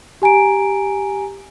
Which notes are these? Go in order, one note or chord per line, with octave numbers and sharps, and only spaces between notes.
G4 G#5 A#5 D7